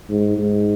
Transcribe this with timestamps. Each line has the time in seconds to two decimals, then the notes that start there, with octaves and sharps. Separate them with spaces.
0.10 G#2
0.38 G#2